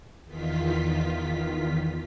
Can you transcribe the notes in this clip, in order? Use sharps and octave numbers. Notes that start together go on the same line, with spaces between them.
E2 D#3 F4 B6